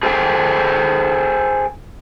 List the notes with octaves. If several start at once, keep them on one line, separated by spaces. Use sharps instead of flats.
G#4 A4 C5 F#5 G5